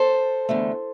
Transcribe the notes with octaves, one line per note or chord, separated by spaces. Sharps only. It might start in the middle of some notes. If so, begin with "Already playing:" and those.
Already playing: A4 C5
E2 D3 A3